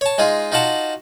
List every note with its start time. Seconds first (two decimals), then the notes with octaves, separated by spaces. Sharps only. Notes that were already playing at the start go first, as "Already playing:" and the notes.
0.01 C#5 A5
0.18 G#3 D#4 F4 G#4
0.52 D#4 F4 F#4 F#5 A5